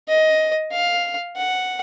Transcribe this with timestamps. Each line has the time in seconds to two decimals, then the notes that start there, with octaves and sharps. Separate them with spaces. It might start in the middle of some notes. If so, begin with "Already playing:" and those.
0.09 D#5
0.72 F5
1.36 F#5